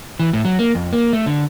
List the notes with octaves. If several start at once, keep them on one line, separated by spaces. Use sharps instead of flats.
E3
A2
F#3
A#3
F2
A#3
A3
D3